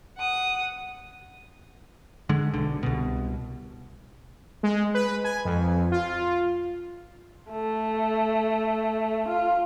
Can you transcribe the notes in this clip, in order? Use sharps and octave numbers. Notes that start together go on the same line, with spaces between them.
F#5 D#6
D3 G#3
B1 D3
C2 B2
G#3
B4
G#5
F2
F4
A3
F4